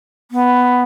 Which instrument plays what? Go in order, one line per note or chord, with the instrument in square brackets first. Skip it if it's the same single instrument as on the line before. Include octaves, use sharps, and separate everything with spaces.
[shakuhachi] B3